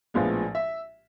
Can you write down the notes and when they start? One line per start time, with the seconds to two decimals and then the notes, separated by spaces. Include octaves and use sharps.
0.14 A#1 A2 F3 G#3 B3 F5
0.55 E5